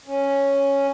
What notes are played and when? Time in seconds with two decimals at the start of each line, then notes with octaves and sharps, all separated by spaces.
0.06 C#4